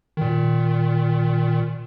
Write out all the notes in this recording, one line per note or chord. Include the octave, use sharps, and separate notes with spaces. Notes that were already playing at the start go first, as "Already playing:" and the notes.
A#2 D#3